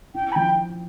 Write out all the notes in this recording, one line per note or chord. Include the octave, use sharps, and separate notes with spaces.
E4 G5
B5
F3 G5